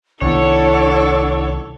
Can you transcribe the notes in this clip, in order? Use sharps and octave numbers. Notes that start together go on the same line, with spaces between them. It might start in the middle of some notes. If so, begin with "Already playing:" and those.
C2 D#3 B3 D4 E4 A4 C#5 F#5